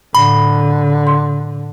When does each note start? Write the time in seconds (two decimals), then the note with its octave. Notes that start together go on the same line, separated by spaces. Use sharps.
0.15 A2 D3 B5
1.07 C6